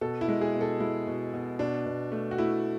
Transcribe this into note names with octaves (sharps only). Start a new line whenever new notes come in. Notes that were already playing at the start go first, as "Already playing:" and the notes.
B2 A4
E4
G#3
G#4
B2
A4
G#3 E4
B2
B2
B2 D4
B2
A3
F#4
A3 E4